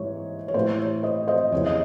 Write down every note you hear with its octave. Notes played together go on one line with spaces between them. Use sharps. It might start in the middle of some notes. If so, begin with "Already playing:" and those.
Already playing: G#2 E3 C#5
C#5
A2 E3 C5
C#5
C5 D#5
C5 D#5
E2 C#3 E3 C#5
D#5